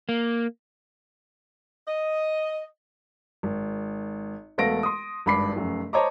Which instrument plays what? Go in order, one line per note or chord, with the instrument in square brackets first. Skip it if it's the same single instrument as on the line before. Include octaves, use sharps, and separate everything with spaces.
[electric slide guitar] A#3
[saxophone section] D#5
[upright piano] G#1
E1 A3 B3 F5 A#6 D7
C6 D#6
G#1 G2 B5 D6 C7
F1 F#2
C5 C#5 D#5 A5 A#5 D6